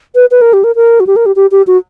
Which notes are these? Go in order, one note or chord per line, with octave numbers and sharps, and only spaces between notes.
B4
B4
A#4
G4
A#4
A#4
F#4
G4
A#4
G4
G4
G4
F#4